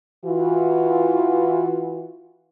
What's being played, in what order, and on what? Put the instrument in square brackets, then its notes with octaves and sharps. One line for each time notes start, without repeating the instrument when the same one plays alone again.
[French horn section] E3 F4 F#4